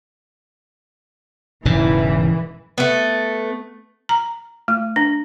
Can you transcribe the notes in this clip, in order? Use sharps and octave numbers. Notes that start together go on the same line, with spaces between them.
E1 G#2 C#3 E3
A3 B3
A#5
A3
D4